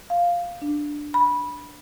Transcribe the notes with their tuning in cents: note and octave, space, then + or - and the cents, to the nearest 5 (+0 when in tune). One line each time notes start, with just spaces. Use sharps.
F5 +0
D4 +5
B5 -15